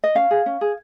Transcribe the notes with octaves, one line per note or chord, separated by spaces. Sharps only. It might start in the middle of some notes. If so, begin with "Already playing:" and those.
D#5
C#4 F5
G#4
C#4
G#4